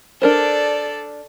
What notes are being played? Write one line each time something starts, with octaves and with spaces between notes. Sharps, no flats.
D4 A4 A#4 C5 D5